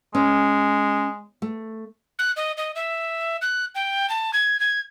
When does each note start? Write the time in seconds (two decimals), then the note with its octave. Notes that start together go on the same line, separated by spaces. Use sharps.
0.15 G#3 C#4
1.42 A3
2.19 F#6
2.36 D#5
2.57 D#5
2.75 E5
3.41 F#6
3.75 G5
4.09 A5
4.33 G#6
4.60 G#6